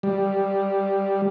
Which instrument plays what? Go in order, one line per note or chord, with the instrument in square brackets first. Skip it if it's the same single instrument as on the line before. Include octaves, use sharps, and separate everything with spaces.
[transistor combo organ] G3